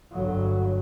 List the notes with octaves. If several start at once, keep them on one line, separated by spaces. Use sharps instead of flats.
G1 F#3